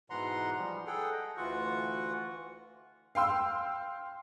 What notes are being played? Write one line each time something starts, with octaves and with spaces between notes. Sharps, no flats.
G#2 B2 E3 F#5 A#5 C6
F3 G3
G#4 A4 F#5 G5
D#5
D2 E3 F4 F#4 F#5 C#6
F5 G5 C6 E6